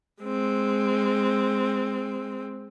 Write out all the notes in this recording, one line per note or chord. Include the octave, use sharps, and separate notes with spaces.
G#3 C4